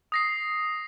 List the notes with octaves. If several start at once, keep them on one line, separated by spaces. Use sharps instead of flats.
D#6 A#6 C7